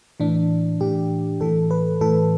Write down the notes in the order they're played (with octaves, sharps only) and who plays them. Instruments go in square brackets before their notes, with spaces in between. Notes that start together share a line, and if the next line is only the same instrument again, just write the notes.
[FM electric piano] A2 E3 D4
A2 E3 G4
A2 E3 A4
B4
A2 E3 A4